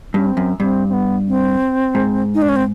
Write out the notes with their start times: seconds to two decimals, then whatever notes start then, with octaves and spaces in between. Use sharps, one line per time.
0.14 G2 C#4
0.26 C4
0.37 F#2
0.60 G2 C4
0.89 C4
0.93 B3
1.28 C4
1.95 G#2
2.35 D#4
2.42 D4
2.49 C#4
2.56 C4